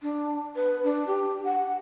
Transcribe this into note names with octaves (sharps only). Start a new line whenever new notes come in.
D4
B4
D4
G4
F#5